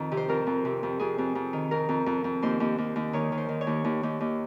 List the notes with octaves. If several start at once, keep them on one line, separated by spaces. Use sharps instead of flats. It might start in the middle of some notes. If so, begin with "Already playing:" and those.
Already playing: F2 D#3
C3
C5
F2 A#4
F2
C3
F2
F2 G#4
F2
F2
D#3
F2 A#4
F2
F2
F2
D#2 C5
D#2
D#2
D#2
D#3 C#5
D#3
C5
D#3
C#5
D#2
D#2
D#2
D#2